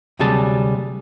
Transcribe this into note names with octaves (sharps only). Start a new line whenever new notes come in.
D2 C3 F#3 G3 G#4 A5